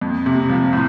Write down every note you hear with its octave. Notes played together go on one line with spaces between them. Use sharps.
F2
C3
F3
A2